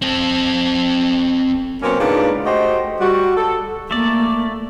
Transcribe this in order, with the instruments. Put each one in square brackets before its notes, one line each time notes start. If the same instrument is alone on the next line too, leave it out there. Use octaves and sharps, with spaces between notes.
[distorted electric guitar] C4 A4
[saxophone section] B2 F#3 A#3 C4 C#4
G#2 C#3 A#3 D4 F4 B4
A3 F#4 G4 C5 D#5
G3 F#4
A4
[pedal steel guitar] A3 D5 [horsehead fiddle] A#3